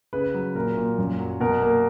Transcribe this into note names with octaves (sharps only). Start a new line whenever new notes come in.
C#3 B4
F#3
A#2 A#4
A#2
F#2
F#3
B2 A#4
A#3